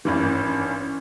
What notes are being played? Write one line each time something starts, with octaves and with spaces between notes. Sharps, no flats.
G#1 G2 E3 C#4
C#4